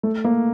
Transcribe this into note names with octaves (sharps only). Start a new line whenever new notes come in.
A3
A#3